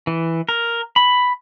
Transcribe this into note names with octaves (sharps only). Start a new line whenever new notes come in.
E3
A#4
B5